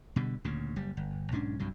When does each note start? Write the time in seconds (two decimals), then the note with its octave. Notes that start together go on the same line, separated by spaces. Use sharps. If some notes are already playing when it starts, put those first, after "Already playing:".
0.16 B2 D3 G3
0.44 D2 A#2 C#3
0.76 F#1 G3
0.97 G1
1.32 B1 G#2 C#4 D4
1.59 C2 G2 C3 F#3